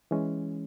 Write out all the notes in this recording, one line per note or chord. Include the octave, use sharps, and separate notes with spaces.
E3 G#3 C#4